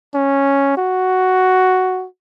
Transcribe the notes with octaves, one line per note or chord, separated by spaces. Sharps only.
C#4
F#4